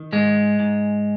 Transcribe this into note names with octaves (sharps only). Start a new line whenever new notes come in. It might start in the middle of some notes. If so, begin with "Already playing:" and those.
Already playing: D#3
G#2 G#3
G#2